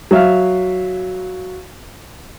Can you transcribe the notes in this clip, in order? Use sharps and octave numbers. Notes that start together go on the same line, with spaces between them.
F#3 E5 F5